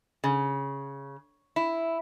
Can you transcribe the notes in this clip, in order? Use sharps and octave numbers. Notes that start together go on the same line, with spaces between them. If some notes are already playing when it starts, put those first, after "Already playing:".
C#3
E4